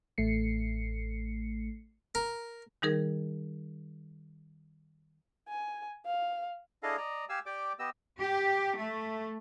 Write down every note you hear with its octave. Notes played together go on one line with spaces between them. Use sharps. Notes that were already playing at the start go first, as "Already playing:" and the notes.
A1 A3 C7 C#7
A#4
D#3 G3 D#4 G#4 A#4
G#5
F5
D4 E4 G#4 A4 D#5 F5
D5 D#5 A#5
G4 F5 G#5 E6
G4 D5 G5 D6
B3 G4 D#5 E6
G4
A3